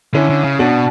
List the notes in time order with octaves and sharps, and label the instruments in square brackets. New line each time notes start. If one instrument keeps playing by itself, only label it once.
[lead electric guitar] D3 [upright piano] C#4 E4
[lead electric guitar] D3
C#3
[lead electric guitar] B2 [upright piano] D4 F#4